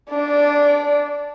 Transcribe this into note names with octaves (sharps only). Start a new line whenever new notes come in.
D4 D5